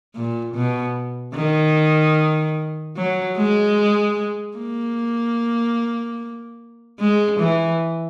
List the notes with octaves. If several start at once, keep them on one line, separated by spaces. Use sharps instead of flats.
A#2
B2
D#3
F#3
G#3
A#3
G#3
E3